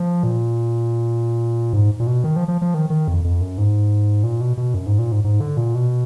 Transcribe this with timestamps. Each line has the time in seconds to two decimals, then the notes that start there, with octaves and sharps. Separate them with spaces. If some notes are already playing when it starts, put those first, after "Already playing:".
Already playing: F3
0.23 A#2
1.73 G#2
2.00 A#2
2.07 B2
2.24 D#3
2.36 F3
2.48 F3
2.62 F3
2.74 D#3
2.90 D#3
3.08 F2
3.24 F2
3.41 F#2
3.58 G#2
4.23 A#2
4.41 B2
4.57 B2
4.74 F#2
4.86 G#2
4.99 A#2
5.12 G#2
5.24 G#2
5.40 D3
5.57 A#2
5.75 B2